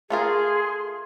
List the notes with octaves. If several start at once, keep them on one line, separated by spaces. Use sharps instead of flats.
A3 F4 G#4 A#4 C6